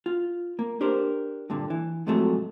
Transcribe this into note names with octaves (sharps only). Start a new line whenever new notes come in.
F4
A#3
D4 G4 A#4 C5
G2 A#2 D3
E3
G#2 C3 F3 F#3 G#3 A3